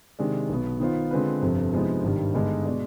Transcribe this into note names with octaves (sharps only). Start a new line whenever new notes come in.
C3 D#3 G#3 D4
B1 B2 B3
D#3 B3 F4 C5 F5
D3 G#3 C4 F4 B4
G1 F2 C3
C3 F3 G#3 B3 D#4
G#1 G2 D#3 G3
G2 D3 G#3 B3 D#4
B2 G#3 D4